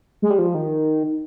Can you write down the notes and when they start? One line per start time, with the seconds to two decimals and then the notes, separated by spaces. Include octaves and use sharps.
0.22 G#3
0.30 G3
0.39 F3
0.55 D#3